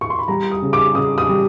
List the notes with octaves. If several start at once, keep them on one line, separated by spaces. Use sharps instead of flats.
C#6
C6
B5
G3 A#5
D#6
C#3
D6
C#3 D#6
D#6
G3